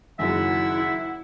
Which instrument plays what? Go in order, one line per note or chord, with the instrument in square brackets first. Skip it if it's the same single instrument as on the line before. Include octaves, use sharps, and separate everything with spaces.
[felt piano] F#1 F#2 D#3 [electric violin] E4 [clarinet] E5 [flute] F#5